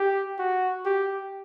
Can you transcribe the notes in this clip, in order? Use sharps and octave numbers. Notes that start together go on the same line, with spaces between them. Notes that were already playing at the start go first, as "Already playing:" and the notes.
Already playing: G4
F#4
G4